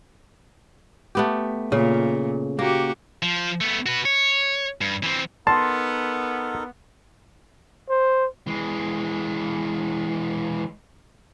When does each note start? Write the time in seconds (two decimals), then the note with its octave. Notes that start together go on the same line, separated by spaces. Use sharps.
1.15 A3 B3 G4
1.72 A#2 C#3
2.59 A#3 F#4 G4
3.22 F3
3.61 A3 B3
3.86 F#4 B4
4.05 C#5
4.81 G2
5.03 E3 C4
5.47 B3 D#4 A4 A#4 A5 C6
7.89 C5
8.47 E3 G#3